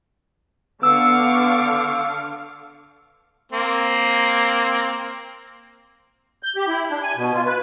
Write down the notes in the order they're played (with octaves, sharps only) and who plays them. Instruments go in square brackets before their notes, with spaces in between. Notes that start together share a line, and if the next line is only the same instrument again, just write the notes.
[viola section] D3 F5 [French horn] B3 [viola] C#6 D6 [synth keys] E6
[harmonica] A#3 C4
[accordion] G6
G4
E4
D4
G#5
B2
F4
B4